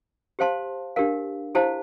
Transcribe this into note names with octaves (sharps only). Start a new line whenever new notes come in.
G4 C5 F5 A5 C6
D4 G4 A#4 F5
E4 G4 C5 F5 A5